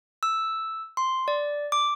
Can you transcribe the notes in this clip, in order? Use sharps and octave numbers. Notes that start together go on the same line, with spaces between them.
E6
C6
D5
D6